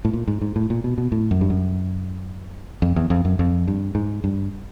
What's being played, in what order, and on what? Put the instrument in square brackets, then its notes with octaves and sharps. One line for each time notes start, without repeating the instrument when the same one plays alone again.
[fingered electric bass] A2
A#2
G#2
G#2
A2
A#2
B2
B2
A2
F#2
G2
F#2
F2
E2
F2
F#2
F2
G2
G#2
G2